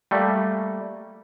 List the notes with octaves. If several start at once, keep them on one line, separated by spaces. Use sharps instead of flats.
G3 A3 A#3